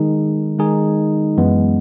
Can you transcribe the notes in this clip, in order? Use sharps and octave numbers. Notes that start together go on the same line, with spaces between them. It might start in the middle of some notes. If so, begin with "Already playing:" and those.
Already playing: D#3 G#3 D#4 G#4
D#3 G#3 D#4 G#4
F#2 E3 G#3 B3